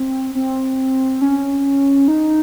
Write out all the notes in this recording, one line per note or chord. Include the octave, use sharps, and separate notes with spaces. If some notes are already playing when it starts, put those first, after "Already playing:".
Already playing: C4
C4
C#4
D#4